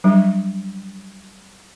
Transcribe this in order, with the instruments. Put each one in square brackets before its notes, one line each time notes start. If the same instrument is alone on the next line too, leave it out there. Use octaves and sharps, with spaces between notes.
[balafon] F#3 G3 D4